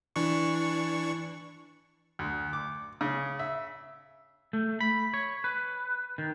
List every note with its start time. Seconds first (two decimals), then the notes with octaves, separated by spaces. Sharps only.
0.16 E3 D4 C#6
2.19 D2
2.53 D6
3.01 C#3
3.39 E5
4.53 A3
4.81 B5
5.14 C#5
5.44 B4
6.18 D#3